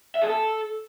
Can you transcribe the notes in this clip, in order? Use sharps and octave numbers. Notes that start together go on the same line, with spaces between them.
E5
G#4
A4